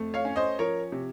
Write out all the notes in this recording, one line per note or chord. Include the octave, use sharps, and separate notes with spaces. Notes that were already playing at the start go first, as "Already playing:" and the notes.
Already playing: F2 A3
C#5 F5
C#4
C5 D#5
F3 A#4 C#5
C3